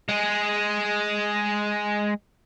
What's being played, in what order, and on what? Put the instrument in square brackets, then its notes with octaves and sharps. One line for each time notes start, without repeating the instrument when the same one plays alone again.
[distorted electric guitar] G#3 G#4